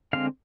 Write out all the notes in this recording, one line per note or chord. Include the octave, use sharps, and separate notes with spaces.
D3 G#3 C4 F5